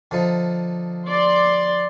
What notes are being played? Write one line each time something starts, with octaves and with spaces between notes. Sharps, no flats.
D3 F3 D#4
D5 C6